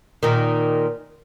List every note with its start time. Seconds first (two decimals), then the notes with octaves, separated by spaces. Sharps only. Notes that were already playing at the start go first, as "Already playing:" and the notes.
0.23 A#2 D#3